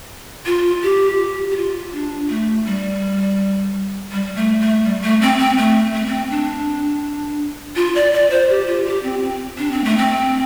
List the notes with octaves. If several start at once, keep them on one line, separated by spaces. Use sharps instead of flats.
F4
G4
G4
G4
F4
D4
A3
G3
G3
A3
A3
G3
A3
C4
C4
A3
A3
C4
D4
F4
D5
D5
C5
G4
F4
G4
C4
C4
D4
C4
A3
C4